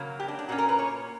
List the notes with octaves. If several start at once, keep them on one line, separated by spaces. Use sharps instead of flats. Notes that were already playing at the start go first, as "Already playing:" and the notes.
Already playing: C#3 F#3 A#3
G4
D4
D4
A#2 A#3 C#4 F#4
A#4
B4
C#5